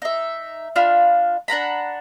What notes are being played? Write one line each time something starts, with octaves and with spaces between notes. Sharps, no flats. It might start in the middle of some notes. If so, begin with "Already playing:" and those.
D#4 E5
D4 F4 F5 B5
D4 F#5 A#5 B5